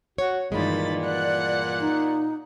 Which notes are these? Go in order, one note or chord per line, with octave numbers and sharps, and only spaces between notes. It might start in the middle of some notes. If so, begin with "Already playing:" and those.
F#4 C#5
G2 A#2 D#3 E3 G#3 B5 A6
D5 F#5 F#6
D#4